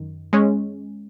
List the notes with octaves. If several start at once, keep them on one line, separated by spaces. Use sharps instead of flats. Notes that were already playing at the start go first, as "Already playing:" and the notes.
Already playing: F#2 D#3
G#3 C#4